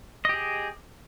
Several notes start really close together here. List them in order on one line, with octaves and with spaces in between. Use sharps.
D#5 G4 G#4